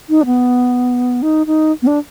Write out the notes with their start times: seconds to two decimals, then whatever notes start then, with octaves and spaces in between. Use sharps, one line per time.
0.09 D#4
0.21 D4
0.25 B3
1.22 D#4
1.47 D#4
1.82 B3
1.87 D4